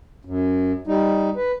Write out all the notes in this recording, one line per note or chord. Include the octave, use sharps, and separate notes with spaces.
F#2
G3 D#4
B4